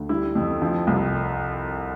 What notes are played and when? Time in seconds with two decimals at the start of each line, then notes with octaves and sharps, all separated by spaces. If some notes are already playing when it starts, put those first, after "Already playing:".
Already playing: D2
0.09 G3 E4
0.35 F2
0.62 F3
0.87 C2